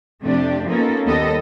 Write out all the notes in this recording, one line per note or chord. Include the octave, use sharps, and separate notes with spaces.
F2 C3 F3 A3 D4 G4
A#3 B3 C#4 D#4 F4 A4
D#2 G3 B3 A4 D#5